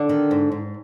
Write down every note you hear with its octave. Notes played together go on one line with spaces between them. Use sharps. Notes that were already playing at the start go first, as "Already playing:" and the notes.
Already playing: D3 D4
D#3
G#2
G#2